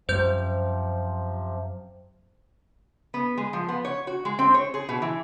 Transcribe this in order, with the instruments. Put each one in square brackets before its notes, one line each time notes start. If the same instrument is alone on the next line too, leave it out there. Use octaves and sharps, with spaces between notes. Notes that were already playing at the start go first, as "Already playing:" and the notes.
[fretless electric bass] F#2 G3 [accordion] C3 F3 [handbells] C5 G6
[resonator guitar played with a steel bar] B3
G#3
F3
B3
C#5
F#4
G#3
C4
C#5
G#4
B2
E3